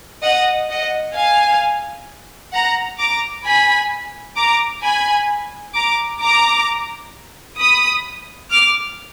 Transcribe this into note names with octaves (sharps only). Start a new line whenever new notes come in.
D#5 F#5
D#5 F#5
F5 G#5
F#5 A#5
A#5 D6
G#5 B5
A#5 D6
G#5 B5
A#5 D6
A#5 D6
B5 D#6
D6 F6